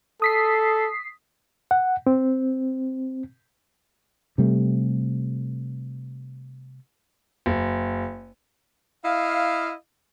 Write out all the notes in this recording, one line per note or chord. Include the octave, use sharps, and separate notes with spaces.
A4 D#6 B6 C7
F#5
C4
C3 G3 A3
F#1
E4 D#5 F5